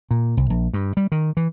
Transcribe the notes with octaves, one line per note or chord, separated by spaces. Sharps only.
A#2
C2
A#1
G2
G3
D#3
E3